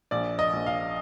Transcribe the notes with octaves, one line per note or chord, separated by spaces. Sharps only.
A#1 D5
D#5
A#1
F5